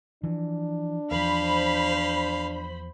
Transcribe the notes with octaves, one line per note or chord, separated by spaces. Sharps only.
E3 F3 D4
E2 F3 C5 F5 B5